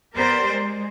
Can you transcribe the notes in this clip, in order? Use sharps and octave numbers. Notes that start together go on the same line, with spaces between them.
B3 G4 A#4 C5 D5
G#3